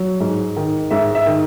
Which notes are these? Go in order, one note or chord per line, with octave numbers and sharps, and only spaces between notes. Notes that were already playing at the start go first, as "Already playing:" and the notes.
Already playing: F#3
G#2
D#3
G#2 E5
E5
D#3